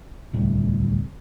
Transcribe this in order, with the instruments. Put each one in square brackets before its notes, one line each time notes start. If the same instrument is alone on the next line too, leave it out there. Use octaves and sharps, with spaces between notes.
[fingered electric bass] D1 C2